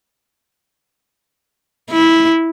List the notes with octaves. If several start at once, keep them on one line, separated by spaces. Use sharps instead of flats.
E4